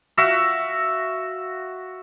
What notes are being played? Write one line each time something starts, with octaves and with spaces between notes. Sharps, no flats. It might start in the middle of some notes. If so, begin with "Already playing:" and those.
F#4 E5 F5